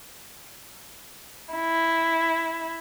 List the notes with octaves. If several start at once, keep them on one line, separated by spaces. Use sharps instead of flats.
E4